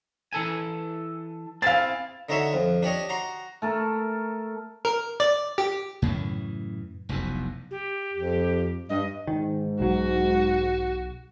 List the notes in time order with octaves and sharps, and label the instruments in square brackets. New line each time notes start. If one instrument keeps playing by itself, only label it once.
[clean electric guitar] E3 A4 G#5
[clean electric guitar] C4 E4 G#4 [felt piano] F5 A6
[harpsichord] D3 D#4 F#4 C#5 E5 C6
F2
D4 G4 C#5 D#5
F#4 A#5 C6
[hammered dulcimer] A3 A4 A#4
[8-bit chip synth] A#4
D5
G4
[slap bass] F#2 A2 C#3 E3
F1 B1 E2 B2
[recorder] G4
[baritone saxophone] F2
[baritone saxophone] G2 [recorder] D#5
[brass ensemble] G#2 [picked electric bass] D#3
[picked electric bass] B1 F#3 [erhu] F#4